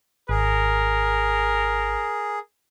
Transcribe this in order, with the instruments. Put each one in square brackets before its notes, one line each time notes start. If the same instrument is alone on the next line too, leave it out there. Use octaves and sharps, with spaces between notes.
[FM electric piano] G#1 [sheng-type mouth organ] G#4 [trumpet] A#4